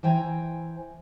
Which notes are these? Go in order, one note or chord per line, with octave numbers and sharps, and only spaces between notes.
E3 C5 G5 G#5 A#5